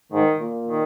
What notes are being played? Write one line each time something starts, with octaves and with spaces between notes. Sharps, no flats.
G#2 D#3
A#2
D#3